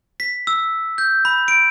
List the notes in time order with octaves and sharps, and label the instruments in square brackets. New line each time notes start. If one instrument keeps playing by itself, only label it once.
[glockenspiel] B6
E6
G6
B5
D7